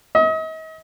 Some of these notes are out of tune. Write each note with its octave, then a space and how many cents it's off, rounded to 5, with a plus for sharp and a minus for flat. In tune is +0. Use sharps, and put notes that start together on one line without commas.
D#5 +40